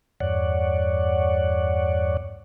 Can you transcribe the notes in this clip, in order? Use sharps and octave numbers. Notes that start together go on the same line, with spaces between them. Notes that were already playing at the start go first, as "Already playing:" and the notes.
E2 G2 C#5 D5 F#5